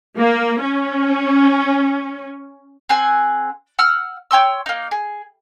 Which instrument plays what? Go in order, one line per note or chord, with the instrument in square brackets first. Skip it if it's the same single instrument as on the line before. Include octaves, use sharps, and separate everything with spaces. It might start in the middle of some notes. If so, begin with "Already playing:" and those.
[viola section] A#3
C#4
[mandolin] C4 G#4 F#5 G#5
F#5 E6 F6
C#5 G5 C6 E6
A#3 D#4
G#4